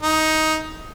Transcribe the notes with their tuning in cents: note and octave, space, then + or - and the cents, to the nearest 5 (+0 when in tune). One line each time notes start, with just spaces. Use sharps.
D#4 +15